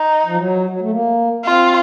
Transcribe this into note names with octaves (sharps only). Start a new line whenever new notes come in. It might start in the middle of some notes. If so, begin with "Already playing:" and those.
Already playing: D#4
F3
F#3
F#3
A3
A#3
C4 F4